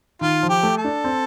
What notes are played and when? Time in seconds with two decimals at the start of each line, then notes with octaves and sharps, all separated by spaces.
0.21 D#3 F4
0.43 F3
0.49 G4
0.63 A3
0.77 A4
0.85 D4
1.04 C4